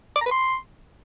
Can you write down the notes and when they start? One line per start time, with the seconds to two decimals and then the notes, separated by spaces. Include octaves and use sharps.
0.16 D6
0.21 A#5
0.26 B4
0.31 C6